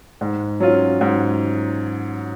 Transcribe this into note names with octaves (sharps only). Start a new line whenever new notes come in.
G#2
F#3 C#4 F4
G#2